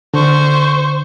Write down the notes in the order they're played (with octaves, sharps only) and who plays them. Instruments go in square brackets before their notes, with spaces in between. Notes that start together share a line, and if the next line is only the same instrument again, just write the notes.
[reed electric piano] D3 [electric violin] C5 C#6